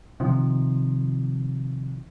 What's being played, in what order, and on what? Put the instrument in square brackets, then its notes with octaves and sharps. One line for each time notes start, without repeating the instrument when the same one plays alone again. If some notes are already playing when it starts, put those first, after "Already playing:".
[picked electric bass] C3 D#3 F3